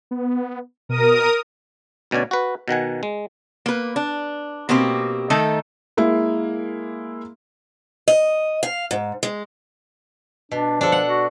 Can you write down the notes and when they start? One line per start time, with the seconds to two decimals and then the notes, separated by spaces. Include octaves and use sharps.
0.11 B3
0.89 B2 A#4 D#6
2.11 D2 B2 C#4 D5 G#5
2.31 F#4 B4
2.68 B2 D#3 F#5 G#5
3.03 G#3
3.66 A#3 B4
3.96 D4
4.69 B2 A#3 C4 G4
5.30 D#3 A3 D#4 A4
5.97 G#3 A#3 E4
8.08 D#5
8.63 F5
8.91 G#2
9.23 G#3
10.52 B2 D4
10.81 F3 D4 A4
10.92 F#5
11.07 F#4